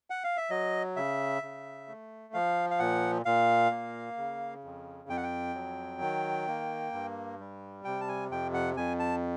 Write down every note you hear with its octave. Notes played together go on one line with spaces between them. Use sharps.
F#5
F5
E5
F#3 D#5
C#3 E5
C#3
A3
F3 F5
F5
A#2 F#5
A#2 F5
A#3
C#3
F2
F2 G5
F#5
G5
F#3
D#3
A#3
G2
G3
C3 G5
A5
G#5
F2 G5
F#5
F2 G#5
A5